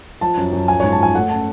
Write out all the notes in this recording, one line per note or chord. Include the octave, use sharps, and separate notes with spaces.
F3 A5
F#2
F#2
F3 G#5
C#5
G#2
A5
F3 G#5
A3 F#5
C#4 A5